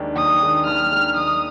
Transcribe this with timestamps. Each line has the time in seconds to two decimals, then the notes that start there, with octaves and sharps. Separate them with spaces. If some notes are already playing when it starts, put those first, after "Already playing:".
Already playing: D#2 D#3 G#3 D4
0.16 D#2 D#6
0.41 D#3 G#3 D4
0.66 D#2 F6
0.92 D#3 G#3 D4
1.17 D#2 D#6